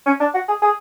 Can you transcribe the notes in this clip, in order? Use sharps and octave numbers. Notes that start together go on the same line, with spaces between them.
C#4
D4
F#4
G#4
G#4